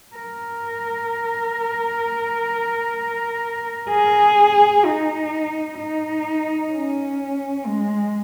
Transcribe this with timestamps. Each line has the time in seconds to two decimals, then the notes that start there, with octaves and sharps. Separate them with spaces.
0.16 A#4
3.90 G#4
4.85 D#4
5.79 D#4
6.72 C#4
7.67 G#3